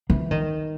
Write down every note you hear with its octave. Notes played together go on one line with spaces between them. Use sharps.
E3
D#3